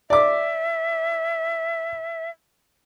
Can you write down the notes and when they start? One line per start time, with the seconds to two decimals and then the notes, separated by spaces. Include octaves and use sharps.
0.10 D5 E5 D6